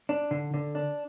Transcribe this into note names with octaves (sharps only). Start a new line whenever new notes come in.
D4
D3
D3
D4